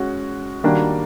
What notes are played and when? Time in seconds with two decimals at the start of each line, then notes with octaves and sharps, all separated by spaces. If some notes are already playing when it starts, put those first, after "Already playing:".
Already playing: G#3 C#4 F#4
0.64 D#3 G3 A#3 D4 F#4